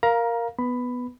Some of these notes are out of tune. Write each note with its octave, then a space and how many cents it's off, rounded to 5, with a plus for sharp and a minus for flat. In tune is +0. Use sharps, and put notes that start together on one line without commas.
A#4 +0 F5 +0 A#5 +20
B3 +0 B5 +10